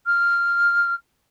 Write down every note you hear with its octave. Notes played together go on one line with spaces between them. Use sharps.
F6